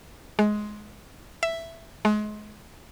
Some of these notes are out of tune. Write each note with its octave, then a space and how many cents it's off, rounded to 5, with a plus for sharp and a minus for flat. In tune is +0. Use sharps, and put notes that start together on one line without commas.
G#3 +15
E5 +5
G#3 +30